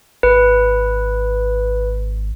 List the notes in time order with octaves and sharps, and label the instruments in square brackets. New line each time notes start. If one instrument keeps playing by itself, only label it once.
[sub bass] G#1 [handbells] B4